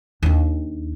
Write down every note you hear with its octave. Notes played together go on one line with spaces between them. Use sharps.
D#2 D4